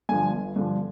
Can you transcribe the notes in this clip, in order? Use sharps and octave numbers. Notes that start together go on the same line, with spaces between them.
G2 D3 F3 G#5
G1
G2 D3 F3